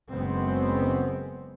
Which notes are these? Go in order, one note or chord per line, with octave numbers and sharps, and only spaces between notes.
F#1 F#2 G#3 B3 C4